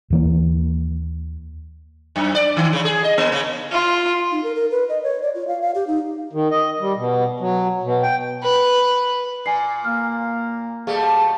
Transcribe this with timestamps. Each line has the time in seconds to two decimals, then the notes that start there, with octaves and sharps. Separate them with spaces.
0.10 D#2 E3 A#3
2.16 F#2
2.35 D5
2.57 D#3
2.73 C#3
2.85 G#4
3.04 D#5
3.18 A#3
3.32 C#3
3.72 F4
4.31 D#4
4.44 A#4
4.56 A#4
4.71 B4
4.89 D#5
5.03 C#5
5.22 D5
5.35 F4
5.48 F5
5.62 F5
5.75 G4
5.87 D#4
6.33 D#3
6.51 D#5
6.80 G3
6.96 B2
7.40 F#3
7.83 B2
8.03 G5
8.44 B4
9.46 A#2 G#5 C7
9.84 A#3 F6
10.87 B2 G3 A3 G#4 F5